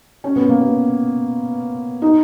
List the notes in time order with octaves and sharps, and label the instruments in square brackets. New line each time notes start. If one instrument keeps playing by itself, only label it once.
[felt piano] C#4
B3
A#3
B3
D#4